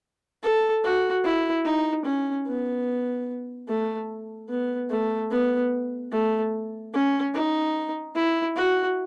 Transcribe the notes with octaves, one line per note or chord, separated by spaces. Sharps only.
A4
F#4
E4
D#4
C#4
B3
A3
B3
A3
B3
A3
C#4
D#4
E4
F#4